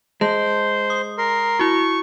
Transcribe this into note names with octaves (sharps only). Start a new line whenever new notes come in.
G#3 C5 A5
D#6
A#4 C6
E4 F#4 C#6